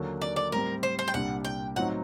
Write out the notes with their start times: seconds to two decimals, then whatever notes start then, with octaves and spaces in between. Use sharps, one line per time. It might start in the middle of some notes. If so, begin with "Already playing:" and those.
Already playing: D#2 D3 F#3 A#3
0.21 D5
0.36 D5
0.52 A2 G3 C4 A#4
0.83 C5
0.99 C5
1.08 G5
1.14 C2 A#2 G3 D4 F#5
1.45 G5
1.76 A2 F#3 C4 D#4 F#5